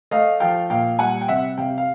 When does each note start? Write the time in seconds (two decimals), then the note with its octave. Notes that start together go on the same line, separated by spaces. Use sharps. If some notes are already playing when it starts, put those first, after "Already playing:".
0.11 A3 D#5 F5
0.40 F3 F5 G5
0.70 A#2 F5 G5
0.99 G3 F#5 G#5
1.21 G5
1.28 C3 E5 F#5
1.58 C3 F5 G5
1.78 F5